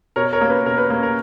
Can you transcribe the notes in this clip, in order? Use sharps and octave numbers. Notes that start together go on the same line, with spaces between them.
B2 A#4 C#5
A#4 C#5
A#3 C#4
B4
B2 A#4
B4
A#3 C#4
A#4